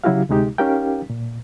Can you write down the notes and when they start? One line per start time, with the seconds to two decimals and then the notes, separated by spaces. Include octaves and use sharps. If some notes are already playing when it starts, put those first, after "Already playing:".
0.04 C#3 F#3 E4 F#4 G4 F5
0.29 D2 C3 G#3 D#4 G4
0.58 C#4 D#4 G4 A#4 F5 G5
1.10 A#2